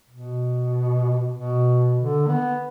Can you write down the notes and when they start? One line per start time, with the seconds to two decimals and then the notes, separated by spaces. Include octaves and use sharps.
0.10 B2
1.34 B2
1.97 D3
2.28 B3